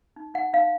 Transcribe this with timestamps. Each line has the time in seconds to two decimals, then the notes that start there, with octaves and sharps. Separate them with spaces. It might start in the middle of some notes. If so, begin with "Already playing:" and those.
0.16 D#4
0.34 D#4 F#5
0.53 D#4 F5